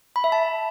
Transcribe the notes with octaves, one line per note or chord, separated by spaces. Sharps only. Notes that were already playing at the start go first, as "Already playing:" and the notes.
B5
E5
A5